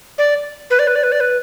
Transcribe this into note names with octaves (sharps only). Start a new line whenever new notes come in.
D5
B4
D5
B4
D5
B4
D5
B4